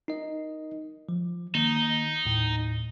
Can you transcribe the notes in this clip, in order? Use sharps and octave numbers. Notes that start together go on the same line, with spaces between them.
D#4 A#4 D#5
F3
D#3 A#3 D#4
D#2 A2